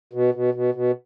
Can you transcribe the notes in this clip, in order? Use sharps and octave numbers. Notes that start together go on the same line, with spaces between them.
B2
B2
B2
B2